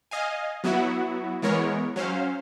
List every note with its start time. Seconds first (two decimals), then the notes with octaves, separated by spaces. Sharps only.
0.11 D#5 F5 G#5
0.64 F#3 B3 E4 F#4
1.42 E3 G#3 B3 A#4 C#5
1.96 F#3 C#4 C5 F5